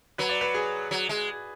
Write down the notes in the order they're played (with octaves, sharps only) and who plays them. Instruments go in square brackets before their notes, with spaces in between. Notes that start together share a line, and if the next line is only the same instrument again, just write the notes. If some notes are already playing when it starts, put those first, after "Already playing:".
[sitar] F#3 [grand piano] B4
[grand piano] D5
B4
G#4
[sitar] F#3
G#3